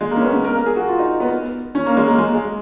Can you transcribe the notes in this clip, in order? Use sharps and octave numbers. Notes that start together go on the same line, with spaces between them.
G#3
A#3
C#4
B3
C#4
A#4
A#4
G#4
F#4
F4
D#4
B3
C#4
A#3
G#3
A#3
G#3
G#3